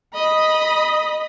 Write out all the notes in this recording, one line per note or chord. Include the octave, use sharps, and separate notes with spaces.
D#5 B5